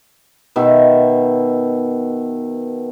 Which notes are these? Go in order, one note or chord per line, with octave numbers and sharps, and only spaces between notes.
B2 D#3 E5